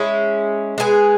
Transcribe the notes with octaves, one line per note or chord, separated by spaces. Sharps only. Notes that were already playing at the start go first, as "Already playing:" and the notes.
Already playing: G#3 C#4 E4
G#3 B3 E4 G#4